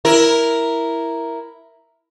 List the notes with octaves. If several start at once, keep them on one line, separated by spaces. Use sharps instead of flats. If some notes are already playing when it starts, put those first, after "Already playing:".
E4 A#4